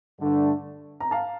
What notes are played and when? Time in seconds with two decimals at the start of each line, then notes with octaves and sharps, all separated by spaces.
0.20 G2 D3 A3 D4
1.00 A#5
1.11 F5 A5